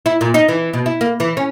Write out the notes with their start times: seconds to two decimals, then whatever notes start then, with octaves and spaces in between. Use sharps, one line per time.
0.06 E4
0.21 A#2
0.34 D#4
0.49 E3
0.73 B2
0.86 E4
1.01 A#3
1.20 E3
1.37 C#4